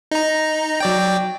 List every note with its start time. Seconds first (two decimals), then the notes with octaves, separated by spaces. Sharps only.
0.11 D#4 A#5
0.80 F#3 D5 G5